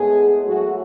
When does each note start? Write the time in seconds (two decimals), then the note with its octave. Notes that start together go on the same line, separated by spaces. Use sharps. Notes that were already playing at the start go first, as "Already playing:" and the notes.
Already playing: A2 G#3 B3 G#4
0.46 A2 F#3 A3 F#4